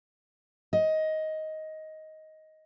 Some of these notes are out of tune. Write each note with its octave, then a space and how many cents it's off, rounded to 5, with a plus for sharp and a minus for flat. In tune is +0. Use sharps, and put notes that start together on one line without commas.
D#5 +10